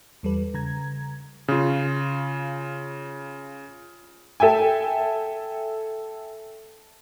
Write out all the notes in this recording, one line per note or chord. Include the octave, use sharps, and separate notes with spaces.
E2 G3 A4 B4
C#3 A#5 G#6
C#3 F4
A4 E5 G5 G#5